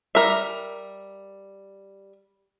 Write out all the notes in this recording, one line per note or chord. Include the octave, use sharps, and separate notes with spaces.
G3 A#4 E5